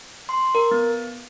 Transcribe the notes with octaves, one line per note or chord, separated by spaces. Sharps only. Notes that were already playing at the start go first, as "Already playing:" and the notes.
C6
A#4
B3